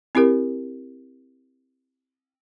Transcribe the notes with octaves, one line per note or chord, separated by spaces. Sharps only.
C4 E4 G4 A#4